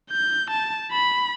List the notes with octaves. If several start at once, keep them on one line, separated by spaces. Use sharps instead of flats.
G6
A5
B5